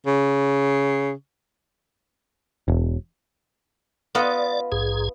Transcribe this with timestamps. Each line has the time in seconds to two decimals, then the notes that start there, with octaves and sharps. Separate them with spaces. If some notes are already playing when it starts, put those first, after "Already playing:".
0.06 C#3
2.68 E1
4.15 B3 F4 D5 D#5
4.72 A#1 G#2 G#4